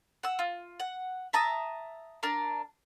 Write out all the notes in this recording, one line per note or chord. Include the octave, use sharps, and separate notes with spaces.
F#5 E6
F4
F#5
E5 A5 A#5 D#6
D4 A#4 A5